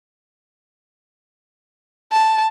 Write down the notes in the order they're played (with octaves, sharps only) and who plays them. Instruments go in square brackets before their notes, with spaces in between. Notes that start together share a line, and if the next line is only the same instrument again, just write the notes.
[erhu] A5